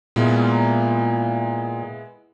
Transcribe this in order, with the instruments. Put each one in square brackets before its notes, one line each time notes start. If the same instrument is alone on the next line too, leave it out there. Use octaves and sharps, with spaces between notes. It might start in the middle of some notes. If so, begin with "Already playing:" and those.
[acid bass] A#2 [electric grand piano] G#3 B3 E4